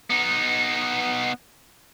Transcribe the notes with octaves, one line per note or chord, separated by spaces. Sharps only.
B3 D#4